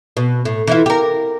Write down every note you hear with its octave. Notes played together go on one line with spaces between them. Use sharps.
B2
A2
E3 E4 F4
G4 A#4